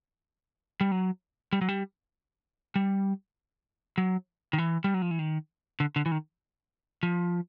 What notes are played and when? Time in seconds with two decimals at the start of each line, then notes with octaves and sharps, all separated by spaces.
0.81 G3
0.92 F#3
1.53 G3
1.61 F#3
1.69 G3
2.76 G3
3.98 F#3
4.53 D#3
4.58 E3
4.84 G3
4.94 F#3
5.02 F3
5.11 E3
5.19 D#3
5.80 D3
5.96 D3
6.06 E3
6.12 D#3
7.03 F3